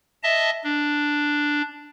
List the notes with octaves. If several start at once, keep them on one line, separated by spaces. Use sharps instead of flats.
D#5 E5 A5
D4